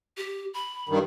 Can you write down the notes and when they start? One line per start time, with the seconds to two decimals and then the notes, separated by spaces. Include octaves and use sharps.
0.17 G4
0.54 B5
0.89 G2 D#3